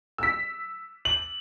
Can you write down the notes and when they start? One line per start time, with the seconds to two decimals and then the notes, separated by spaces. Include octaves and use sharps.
0.18 E6 B6
1.05 F#7